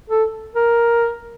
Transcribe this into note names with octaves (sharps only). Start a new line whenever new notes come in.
A4
A#4